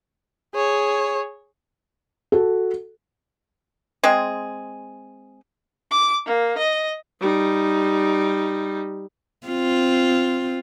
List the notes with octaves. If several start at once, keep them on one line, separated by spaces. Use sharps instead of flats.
G#4 C#5
F#4 A4
G#3 C4 G#4
D6
A#3
D#5
G3 D#4
C4 F4